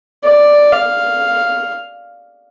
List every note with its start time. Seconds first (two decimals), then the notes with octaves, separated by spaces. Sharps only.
0.25 D5
0.72 F5